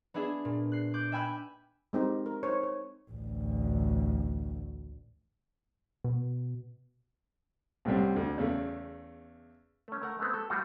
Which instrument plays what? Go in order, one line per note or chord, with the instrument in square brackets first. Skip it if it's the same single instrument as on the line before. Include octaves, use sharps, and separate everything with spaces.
[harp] B3 D4 E4 G#4 E5
A#2
F#6 C7
D6 F#6 G6
E5 G5 G#5 B5 E6 F#6
[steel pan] G#3 C4 D#4 G4 A#4
A#4
D#4 C5 C#5
C#5
[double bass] A1 D2
[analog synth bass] B2
[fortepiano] C2 A2 C3 G3 C4
D2 D3
E2 C#3 A3
[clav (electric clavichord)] A3 C#4
A3 A#4 F#5
G#3 A3 B3 C4
A4
F3 G3 A3 F4 F#4